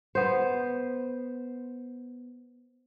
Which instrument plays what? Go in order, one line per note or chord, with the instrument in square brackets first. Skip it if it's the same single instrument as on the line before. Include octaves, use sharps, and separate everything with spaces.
[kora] B3 C5